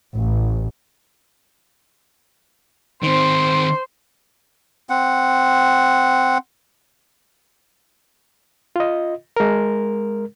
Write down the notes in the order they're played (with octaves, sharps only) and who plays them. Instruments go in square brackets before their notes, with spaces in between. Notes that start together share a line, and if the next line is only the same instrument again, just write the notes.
[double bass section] A1
[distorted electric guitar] D#3 C4 [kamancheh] C5
[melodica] C4 F#5
[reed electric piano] F4 D#5
G#3 A#4